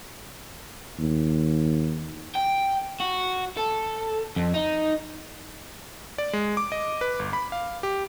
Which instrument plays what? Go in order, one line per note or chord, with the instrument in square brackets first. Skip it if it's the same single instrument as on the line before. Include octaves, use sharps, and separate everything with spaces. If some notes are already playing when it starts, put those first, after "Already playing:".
[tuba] D#2
[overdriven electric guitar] G5
F#4
A4
F2
D#4
[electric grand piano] D5
G#3
D6
D#5
B4
G1
B5
F5
G4